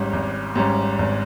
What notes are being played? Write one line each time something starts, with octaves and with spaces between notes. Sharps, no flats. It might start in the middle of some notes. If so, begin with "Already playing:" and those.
Already playing: G#1 G#2 G3 C#4
G#1
G#2 G3 C#4
G#1